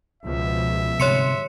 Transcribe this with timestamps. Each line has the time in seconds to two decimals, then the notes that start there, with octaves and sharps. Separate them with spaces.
0.23 C#2 B2 F3 E5
1.00 G1 G#2 C3 C#5 C6 C#7